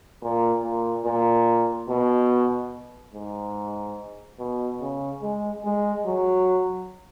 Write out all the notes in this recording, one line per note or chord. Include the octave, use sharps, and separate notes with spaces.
A#2
A#2
A#2
B2
G#2
B2
C#3
G#3
G#3
F#3